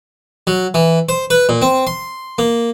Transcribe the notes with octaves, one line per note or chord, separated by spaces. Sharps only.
F#3
E3
C5
B4
A#2
C4
C6
A#3